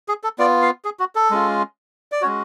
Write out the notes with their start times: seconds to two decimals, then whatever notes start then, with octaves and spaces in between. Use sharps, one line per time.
0.08 G#4
0.24 A4
0.39 B3 F4 D5
0.62 F5
0.85 G#4
1.00 F#4
1.15 A4
1.31 G#3 C#4 F4
2.12 D5
2.22 G#3 C#4 F#4 C#5